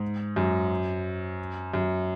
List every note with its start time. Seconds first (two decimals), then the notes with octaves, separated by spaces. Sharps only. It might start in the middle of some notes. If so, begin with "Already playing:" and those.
Already playing: G#2
0.36 F#2
1.74 F#2